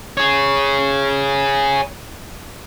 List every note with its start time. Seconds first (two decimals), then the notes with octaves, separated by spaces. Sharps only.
0.17 G#4 C#5